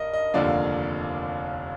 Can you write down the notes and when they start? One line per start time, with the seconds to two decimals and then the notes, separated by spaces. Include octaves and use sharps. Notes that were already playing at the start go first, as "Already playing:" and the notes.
Already playing: G2 A#4 D#5
0.14 D#5
0.34 F1 D#2 D3 F3 A#3 D5